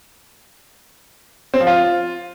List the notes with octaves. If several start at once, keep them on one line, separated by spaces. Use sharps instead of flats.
C4
F3
F4